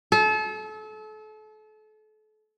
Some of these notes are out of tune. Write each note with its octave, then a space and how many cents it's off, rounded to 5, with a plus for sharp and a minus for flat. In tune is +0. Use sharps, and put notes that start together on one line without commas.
A4 -35